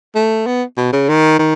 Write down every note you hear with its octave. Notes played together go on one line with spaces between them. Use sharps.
A3
B3
B2
C#3
D#3
D#3